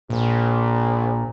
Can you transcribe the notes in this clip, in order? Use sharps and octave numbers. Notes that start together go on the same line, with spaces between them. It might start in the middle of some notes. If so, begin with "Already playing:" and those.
A#1 A#2